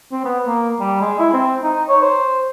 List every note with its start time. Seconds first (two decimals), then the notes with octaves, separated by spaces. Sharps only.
0.12 C4
0.25 B3
0.46 A#3
0.80 G3
1.01 G#3
1.19 E4
1.33 C4
1.63 D#4
1.89 C#5
2.02 C5